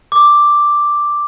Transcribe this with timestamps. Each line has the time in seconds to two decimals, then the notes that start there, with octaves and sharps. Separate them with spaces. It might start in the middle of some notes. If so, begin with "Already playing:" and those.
0.12 D6